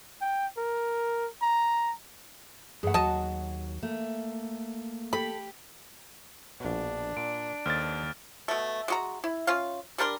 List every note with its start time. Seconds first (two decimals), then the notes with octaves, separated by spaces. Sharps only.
0.22 G5
0.57 A#4
1.42 A#5
2.83 G2 A3 G#4 F#5
2.94 D#2 F#3 D#5 A5
3.83 A3 A#3
5.13 G4 A4 B5
6.60 A#1 B2 D4
7.17 A#2 D7
7.66 D#2 A4 C5 D#5 F6 A6
8.48 B2 A3
8.88 G#3 F#4 A#5
9.24 E4
9.47 C#4 F4 F5
9.98 G3 D4 A#4 C6